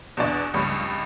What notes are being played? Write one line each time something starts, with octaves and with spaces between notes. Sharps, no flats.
E2 B2 D4 D5
F1 C#2 G2 B5 C#6